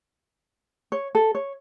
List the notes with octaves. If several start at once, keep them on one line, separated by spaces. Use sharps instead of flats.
C#5
A4
C#5